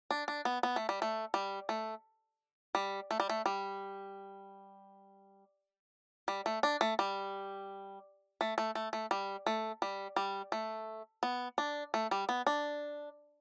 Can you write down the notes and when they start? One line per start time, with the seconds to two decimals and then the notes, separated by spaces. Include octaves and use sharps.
0.11 D4
0.28 D4
0.45 B3
0.63 B3
0.76 A3
0.89 G3
1.02 A3
1.34 G3
1.69 A3
2.75 G3
3.11 A3
3.20 G3
3.29 A3
3.46 G3
6.28 G3
6.46 A3
6.63 D4
6.81 A3
6.99 G3
8.41 A3
8.58 A3
8.75 A3
8.93 A3
9.11 G3
9.46 A3
9.82 G3
10.16 G3
10.52 A3
11.23 B3
11.58 D4
11.94 A3
12.11 G3
12.29 B3
12.47 D4